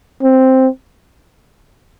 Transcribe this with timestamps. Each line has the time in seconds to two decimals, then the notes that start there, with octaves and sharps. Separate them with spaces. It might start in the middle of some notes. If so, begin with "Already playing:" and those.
0.22 C4